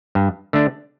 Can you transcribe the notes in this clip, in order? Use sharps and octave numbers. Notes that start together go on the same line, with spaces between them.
G2
D3 A3 D4